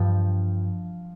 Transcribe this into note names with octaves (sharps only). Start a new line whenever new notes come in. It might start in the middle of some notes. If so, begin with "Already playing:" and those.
Already playing: G2 F3 F5 G5